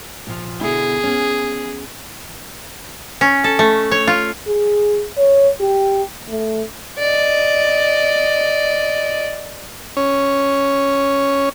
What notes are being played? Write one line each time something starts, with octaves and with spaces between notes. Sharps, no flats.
A#2 F3
B2 D3 E4 G#4
B3 C#4
C#4
A4
A3
C#5
F4
G#4
C#5
G4
A3
D5 D#5
C#4 C#5